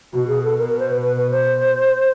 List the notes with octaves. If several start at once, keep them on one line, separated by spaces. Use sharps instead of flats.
B2 F#4
G#4
A4
A#4
A#4
C5
B4
B4
B4
C5